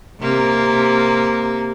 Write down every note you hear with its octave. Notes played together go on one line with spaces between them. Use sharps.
C3 A#3